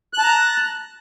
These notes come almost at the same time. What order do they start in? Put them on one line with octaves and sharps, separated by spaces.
F#6 A5 A#5